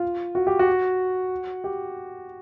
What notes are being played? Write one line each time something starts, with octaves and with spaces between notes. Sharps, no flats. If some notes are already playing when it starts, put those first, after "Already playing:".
Already playing: F4
F#4
G4
F#4
G4